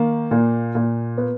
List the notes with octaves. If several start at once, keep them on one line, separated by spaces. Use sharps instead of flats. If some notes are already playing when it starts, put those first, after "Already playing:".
Already playing: D#3 A#3
A#2
A#2
B3